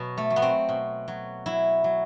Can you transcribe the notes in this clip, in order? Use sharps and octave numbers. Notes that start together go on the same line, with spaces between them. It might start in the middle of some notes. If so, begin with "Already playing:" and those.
Already playing: B2 F#3 B3
A3
F#3
B3
C4
B2
F#3
F#3 E4
F#3